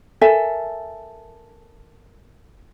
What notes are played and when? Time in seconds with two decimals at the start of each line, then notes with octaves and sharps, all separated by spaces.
0.21 A4 A#4 E5 G#5